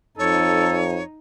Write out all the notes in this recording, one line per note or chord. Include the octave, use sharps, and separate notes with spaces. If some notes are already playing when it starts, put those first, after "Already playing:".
F2 D#4 A4 C#5